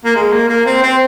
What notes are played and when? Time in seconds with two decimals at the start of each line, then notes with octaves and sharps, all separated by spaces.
0.05 A#3
0.15 G#3
0.32 A#3
0.49 A#3
0.66 C4
0.82 C4